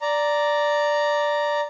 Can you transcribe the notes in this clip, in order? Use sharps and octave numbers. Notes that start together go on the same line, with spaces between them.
D5 A#5